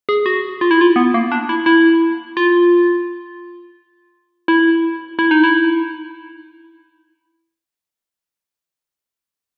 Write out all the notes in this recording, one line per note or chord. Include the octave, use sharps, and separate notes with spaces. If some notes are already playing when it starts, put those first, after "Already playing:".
G#4
F#4
F4
E4
F4
B3
A#3
D4
E4
E4
F4
E4
E4
D#4
E4